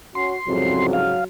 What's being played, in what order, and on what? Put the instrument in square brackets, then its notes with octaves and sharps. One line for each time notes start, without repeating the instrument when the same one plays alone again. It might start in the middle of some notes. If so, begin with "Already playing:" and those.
[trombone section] C#4 F#4 [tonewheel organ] C6
[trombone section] C2 G#2 C#3 [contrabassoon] F2 [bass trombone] F#3
[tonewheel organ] F5